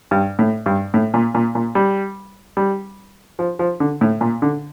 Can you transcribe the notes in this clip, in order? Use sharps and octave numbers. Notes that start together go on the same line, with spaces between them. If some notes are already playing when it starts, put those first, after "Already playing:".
G2
A2
G2
A2
A#2
A#2
A#2
G3
G3
F3
F3
D3
A2
A#2
D3